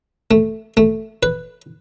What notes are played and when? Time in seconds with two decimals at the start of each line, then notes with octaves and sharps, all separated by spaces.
0.31 A3
0.77 A3
1.23 B4